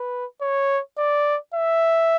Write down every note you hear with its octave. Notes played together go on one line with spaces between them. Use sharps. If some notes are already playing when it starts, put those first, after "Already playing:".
Already playing: B4
C#5
D5
E5